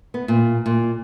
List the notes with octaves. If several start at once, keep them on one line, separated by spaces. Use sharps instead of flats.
B3
A#2
A#2